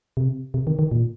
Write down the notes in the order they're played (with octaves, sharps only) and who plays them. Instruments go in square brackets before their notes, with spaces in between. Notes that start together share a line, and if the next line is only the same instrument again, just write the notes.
[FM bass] C3
C3
D#3
D#3
A#2